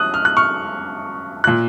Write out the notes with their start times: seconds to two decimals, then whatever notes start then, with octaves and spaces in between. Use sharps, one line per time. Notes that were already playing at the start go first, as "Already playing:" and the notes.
Already playing: F#2 D#6 F#6
0.14 F6
0.25 F#6
0.37 C#6 F6
1.44 A#2 F#6